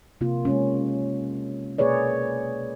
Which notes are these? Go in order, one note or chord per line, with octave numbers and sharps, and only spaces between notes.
C3 A#3 F4
G#3 A#3 C#4
B2 A#3 G#4 B4 C#5 D5